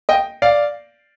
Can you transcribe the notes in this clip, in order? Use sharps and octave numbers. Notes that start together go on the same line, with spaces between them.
D#5 G5
D5 F5